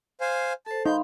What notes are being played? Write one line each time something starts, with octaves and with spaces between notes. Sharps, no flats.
C5 F5 G#5
A4 C5 A5
D#4 F5 B5 C6 G6